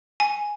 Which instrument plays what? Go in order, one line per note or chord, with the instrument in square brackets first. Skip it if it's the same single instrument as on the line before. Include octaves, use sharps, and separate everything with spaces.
[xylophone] G#5